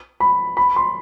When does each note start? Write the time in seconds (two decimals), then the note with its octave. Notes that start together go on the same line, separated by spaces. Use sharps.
0.20 B5
0.57 B5
0.76 C6